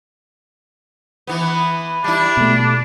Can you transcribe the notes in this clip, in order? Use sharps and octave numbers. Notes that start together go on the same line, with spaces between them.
E3 B3
G3 D4 E4
B2 A3